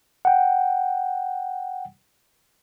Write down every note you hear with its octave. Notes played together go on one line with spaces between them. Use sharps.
F#5 G5